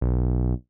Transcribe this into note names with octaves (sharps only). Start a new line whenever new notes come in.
B1